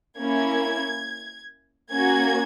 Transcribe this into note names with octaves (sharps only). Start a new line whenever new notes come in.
A#3 C#4 E4 G#6
A#3 C#4 F#4 G#6